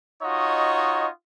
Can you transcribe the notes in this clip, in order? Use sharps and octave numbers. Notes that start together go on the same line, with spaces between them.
D#4 F4 F#4 C#5 D#5